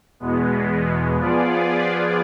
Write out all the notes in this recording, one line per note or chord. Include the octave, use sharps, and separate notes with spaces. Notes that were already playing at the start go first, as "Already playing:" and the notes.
E2 B2 G#3 B3
F3 B3 F4 G#4 D5